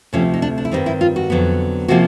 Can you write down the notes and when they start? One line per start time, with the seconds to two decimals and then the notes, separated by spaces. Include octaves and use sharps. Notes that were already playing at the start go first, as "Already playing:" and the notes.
0.13 D2 C3 F3 A3 C#4
0.34 D#4
0.42 D4
0.58 D4
0.65 E4
0.71 G2 D#3 G3 C4 D#4
0.86 E4
1.01 F4
1.16 F#4
1.30 F2 D3 F#3 B3
1.88 C3 F3 A#3 C#4 F#4